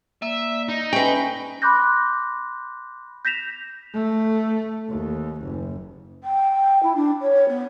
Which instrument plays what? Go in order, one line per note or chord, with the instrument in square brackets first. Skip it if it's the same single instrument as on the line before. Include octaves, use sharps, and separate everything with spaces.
[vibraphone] A#3 D5 [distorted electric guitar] E5
[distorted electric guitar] D#4
[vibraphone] C#4 E5 G#5 [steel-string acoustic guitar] B4 G5
[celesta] B5 C6 D6 F#6 G6 A#6
G6 A#6 B6 E7 F7
[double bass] A3
D#2
F#1
[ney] G5
E4
D4
C#5
B3